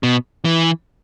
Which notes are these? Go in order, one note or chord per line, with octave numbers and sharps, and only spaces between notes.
B2
E3